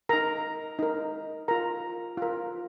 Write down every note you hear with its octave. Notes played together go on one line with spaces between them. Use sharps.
D#4 A#4 A#5
D#4 A#4
F4 A#4 A#5
F4 A#4